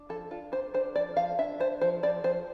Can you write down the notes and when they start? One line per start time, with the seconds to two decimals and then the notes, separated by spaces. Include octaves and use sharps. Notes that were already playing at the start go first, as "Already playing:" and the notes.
Already playing: D4
0.09 F3 A4
0.31 D4 F4
0.52 D4 C5
0.74 D4 C5
0.96 F3 D5
1.17 F3 F5
1.39 D4 E5
1.60 D4 C5
1.81 F3 C5
2.03 F3 D5
2.24 F3 C5